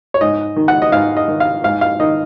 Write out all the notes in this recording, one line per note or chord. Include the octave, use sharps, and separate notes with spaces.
C#5
G#2 D#5
D#3
F#5
D#5
G#2 F5
D#5
D#3
F5
G#2 F5
F5
D#3 D#5